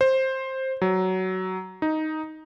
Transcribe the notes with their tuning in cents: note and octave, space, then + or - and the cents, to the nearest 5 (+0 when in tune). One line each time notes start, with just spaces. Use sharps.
C5 +10
F#3 +15
D#4 +5